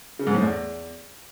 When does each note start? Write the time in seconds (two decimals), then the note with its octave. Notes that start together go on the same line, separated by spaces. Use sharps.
0.19 C#3
0.27 G#2
0.34 A2
0.42 E2